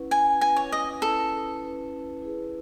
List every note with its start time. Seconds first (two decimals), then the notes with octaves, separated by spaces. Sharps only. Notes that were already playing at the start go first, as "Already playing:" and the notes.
Already playing: C#4 E4 B4 F#5
0.11 G#5
0.41 C#4 E4 B4 F#5 G#5
0.56 C#5
0.72 D#5
1.02 C#4 E4 A4 B4
1.62 C#4 E4 B4
2.22 E4 G#4 B4